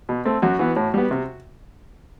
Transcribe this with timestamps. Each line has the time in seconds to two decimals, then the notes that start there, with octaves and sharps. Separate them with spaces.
0.09 B2
0.25 A3 C4
0.42 F#2 F#4
0.59 E3 B3
0.76 A2
0.94 G3 B3
1.11 C3